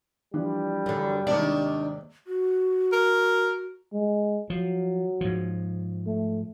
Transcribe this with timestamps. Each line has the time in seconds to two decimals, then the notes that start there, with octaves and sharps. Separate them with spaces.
0.34 E3 F3 G3 D4
0.86 F#2 D3
1.27 D#2 G#2 C3 D#3 D4 D5
2.27 F#4
2.92 A#4
3.93 G#3
4.50 F3 F#3
5.21 G#2 F3
6.07 A3